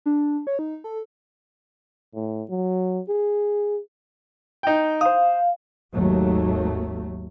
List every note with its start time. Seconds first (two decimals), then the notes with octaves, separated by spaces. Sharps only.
0.06 D4
0.47 C#5
0.59 D#4
0.84 A4
2.15 A2
2.50 F#3
3.09 G#4
4.63 D#4 G5
5.01 C5 F5 D#6
5.93 G#1 D#2 F#3 A3